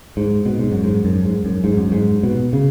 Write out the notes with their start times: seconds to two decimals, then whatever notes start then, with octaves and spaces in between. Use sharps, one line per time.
0.17 G#2
0.46 B2
0.59 G#2
0.72 F#2
0.84 G#2
1.05 F#2
1.25 G#2
1.45 F#2
1.64 G#2
1.77 F#2
1.92 G#2
2.23 B2
2.53 C#3